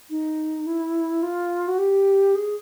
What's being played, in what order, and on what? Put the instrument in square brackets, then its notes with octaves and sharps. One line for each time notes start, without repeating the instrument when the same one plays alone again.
[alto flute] D#4
E4
F4
F#4
G4
G#4